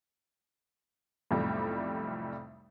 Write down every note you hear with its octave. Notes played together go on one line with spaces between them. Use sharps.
B1 F2 A2 C3 G3